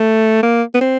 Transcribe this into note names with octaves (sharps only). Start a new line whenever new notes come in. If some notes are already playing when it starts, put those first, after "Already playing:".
Already playing: A3
A#3
B3
C4